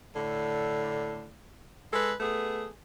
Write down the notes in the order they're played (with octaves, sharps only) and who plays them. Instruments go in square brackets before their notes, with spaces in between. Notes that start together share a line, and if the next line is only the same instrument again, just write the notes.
[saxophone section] A2 D3
G#3 A4 B4
A3 B3 G#4